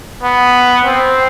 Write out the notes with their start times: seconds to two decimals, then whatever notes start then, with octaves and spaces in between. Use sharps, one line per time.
0.23 B3
0.85 C4